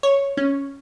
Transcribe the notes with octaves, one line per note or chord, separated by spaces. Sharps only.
C#5
C#4